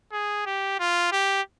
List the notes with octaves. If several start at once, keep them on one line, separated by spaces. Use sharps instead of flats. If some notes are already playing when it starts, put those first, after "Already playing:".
G#4
G4
F4
G4